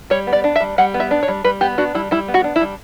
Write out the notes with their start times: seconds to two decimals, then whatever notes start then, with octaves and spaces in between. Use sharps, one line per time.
0.10 G3 C#5
0.27 B3
0.33 D5
0.44 D4
0.56 E5
0.61 G3
0.78 G3 F#5
0.94 B3
1.00 E5
1.11 D4
1.23 C#5
1.28 G3
1.44 G3 B4
1.61 B3 G4
1.78 D4 F#4
1.95 G3 E4
2.11 G3 E4
2.28 B3
2.34 F#4
2.44 D4
2.56 E4
2.61 G3